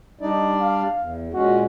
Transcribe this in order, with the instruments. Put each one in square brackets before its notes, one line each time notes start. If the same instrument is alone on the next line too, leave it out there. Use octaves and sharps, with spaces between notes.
[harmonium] G3 D4 D5 [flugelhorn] D#4
[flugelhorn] F5
[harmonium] E2
[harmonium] A#2 G#3 C#4 [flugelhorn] F#4